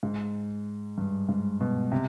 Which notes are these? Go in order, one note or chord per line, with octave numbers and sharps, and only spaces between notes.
G#2
G2
G#2
B2
C3